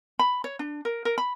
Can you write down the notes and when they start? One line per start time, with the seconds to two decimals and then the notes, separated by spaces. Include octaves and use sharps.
0.19 B5
0.44 C#5
0.59 D4
0.85 A#4
1.05 A#4
1.18 B5